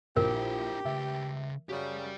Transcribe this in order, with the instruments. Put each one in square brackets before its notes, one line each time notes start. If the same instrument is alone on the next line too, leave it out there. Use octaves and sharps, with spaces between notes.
[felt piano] A#1 [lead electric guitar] D4 E4 [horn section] G4 [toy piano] A#4
[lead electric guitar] C#3 B4 [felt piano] E5
[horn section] F#2 C#3 [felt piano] F#4 [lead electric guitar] G4 D5